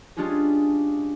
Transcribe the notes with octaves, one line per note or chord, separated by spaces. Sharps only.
G#3 C#4 D4 F4 G4 G#4